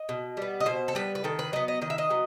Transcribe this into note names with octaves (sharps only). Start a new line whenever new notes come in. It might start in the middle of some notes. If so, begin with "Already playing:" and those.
Already playing: D#5
B2
G3 B3
D#5
B2 C5
A4
G3 B3 B4
B4
D#3 A4
B4
F#3 B3 D#5
D#5
D#3 D#5
E5
D#5
F#3 B3